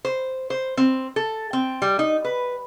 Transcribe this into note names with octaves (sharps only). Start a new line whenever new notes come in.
C5
C5
C4
A4
C4
G3
D#4
B4